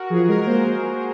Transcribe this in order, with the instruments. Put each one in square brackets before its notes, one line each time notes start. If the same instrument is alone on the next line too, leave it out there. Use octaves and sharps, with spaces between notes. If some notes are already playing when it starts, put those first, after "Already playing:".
Already playing: [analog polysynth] F#4 A#4
[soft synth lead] F3 [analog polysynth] G#4
[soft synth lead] G#3 [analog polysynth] A#4
[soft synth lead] A#3 [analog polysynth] C5